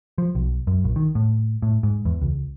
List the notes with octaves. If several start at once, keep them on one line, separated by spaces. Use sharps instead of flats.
F3
B1
F#2
A#1
D#3
A2
A2
G#2
E2
C#2